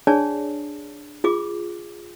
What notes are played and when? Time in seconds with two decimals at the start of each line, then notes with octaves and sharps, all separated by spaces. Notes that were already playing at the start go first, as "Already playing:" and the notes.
0.07 D4 G#4 C#5 D5 A5
1.24 F4 G#4 D6